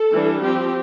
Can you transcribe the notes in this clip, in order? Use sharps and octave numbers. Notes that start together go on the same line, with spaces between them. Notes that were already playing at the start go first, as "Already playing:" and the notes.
Already playing: A4
E3 G3 D4
F3 C4 G4